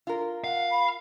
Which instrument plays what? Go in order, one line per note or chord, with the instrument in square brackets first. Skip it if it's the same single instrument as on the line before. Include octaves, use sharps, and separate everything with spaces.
[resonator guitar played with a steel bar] F4 A#4
[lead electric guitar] F5 [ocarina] F#5
[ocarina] B5